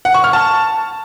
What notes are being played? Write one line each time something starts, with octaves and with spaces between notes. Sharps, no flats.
F#5
C#6
F6
A5